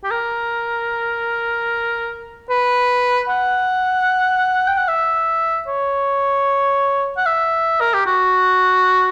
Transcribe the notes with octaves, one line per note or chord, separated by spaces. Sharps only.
G4
A#4
B4
F#5
G5
F#5
E5
C#5
F#5
E5
A#4
G4
F#4